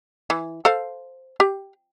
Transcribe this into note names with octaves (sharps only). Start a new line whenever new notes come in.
E3
A4 C5 F5
G4